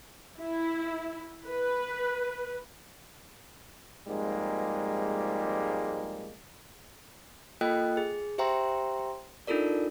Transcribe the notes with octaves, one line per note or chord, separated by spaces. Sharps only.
E4
B4
F2 G#2 G3 G#3 A#3
A#3 F4 A4 D#5 G5 F#6
G#4
G4 C5 E5 G5 A#5 C6
D4 D#4 F4 A4 A#4 D5